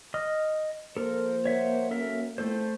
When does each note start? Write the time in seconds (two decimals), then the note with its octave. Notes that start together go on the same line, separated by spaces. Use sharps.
0.14 D#5 D#6 F6
0.97 F3 A#3 A4 A#4 C5
1.45 C#5 E5 F#5
1.91 F#3 C#4 F#4 A4 A#4 E5
2.38 A#2 A3 C4 E4 A4 C5